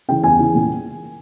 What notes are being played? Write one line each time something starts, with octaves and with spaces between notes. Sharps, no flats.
C#3 E3 G5
E2 G#5
C#3 E3
A#2